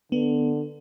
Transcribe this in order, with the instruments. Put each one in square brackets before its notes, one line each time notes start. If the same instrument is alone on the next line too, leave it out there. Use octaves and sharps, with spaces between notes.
[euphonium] D3 [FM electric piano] B3